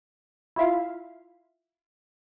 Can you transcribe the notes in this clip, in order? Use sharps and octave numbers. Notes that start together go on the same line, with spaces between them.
E4 F4 E5 F5